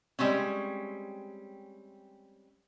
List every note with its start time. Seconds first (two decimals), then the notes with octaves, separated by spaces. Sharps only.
0.19 G3 G#3 C4 C#4